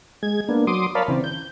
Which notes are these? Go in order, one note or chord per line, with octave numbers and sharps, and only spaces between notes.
G#3 G#6
A#3 B3 D4
F#3 C6 D6 D#6
A#4 C#5 D5 F5 A5 B5
C#3 E3 C4
G6